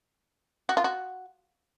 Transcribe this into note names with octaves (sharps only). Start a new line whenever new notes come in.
F#4
F4
F#4